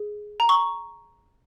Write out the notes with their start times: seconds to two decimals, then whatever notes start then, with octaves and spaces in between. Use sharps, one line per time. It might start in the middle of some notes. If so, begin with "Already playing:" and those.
Already playing: G#4
0.40 A#5
0.49 C#6